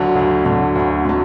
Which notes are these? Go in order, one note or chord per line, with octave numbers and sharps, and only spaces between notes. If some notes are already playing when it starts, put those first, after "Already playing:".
Already playing: D2 D3 F#3
D2
D3 F#3
D2
D3 F#3